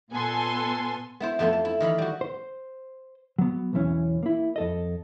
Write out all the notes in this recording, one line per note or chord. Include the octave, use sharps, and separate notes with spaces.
A#2 B3 A4 G#5 C6
B3 E4 C5
F2 F3 A3 B3 E5 C6
A5
E4
D#3 E3 F5 B5
G3 F#4
C5
F#3 B3
B1 E2 E3 C#4
A#3 E4
F2 A4 D#5